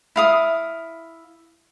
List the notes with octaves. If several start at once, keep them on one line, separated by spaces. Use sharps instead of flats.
E4 F5 D#6